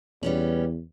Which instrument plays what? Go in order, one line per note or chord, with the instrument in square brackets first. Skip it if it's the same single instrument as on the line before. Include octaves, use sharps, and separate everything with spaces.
[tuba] E2 [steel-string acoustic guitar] G3 B3 C#4